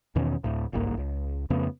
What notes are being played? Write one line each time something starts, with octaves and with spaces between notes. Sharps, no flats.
E2 B2 D#3 C#4
D2 A2
G1 C2 G#2 A#3
C#2
F2 C#3 A3 B3